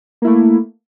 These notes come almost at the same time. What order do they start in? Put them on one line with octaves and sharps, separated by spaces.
A#3 E4 A3